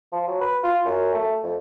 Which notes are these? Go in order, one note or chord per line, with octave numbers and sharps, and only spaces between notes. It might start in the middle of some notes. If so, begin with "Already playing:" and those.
F3
F#3
B4
F4
F#2
A3
F2